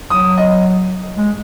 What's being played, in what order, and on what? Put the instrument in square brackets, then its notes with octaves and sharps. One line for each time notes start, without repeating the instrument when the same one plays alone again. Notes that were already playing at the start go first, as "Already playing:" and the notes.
[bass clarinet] F#3 [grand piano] D#6
[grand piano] D#5
[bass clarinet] G#3